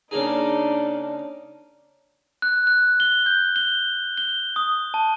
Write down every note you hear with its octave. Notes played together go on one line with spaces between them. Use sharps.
C#3 A#3 D4 D#4 G#4
F#6
F#6
G7
G6
G7
G7
D#6
A5